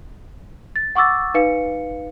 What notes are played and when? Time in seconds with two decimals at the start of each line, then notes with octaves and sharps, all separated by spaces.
0.76 A6
0.95 F#5 C#6 D6 E6 A6
1.34 D#4 B4 F5 C#7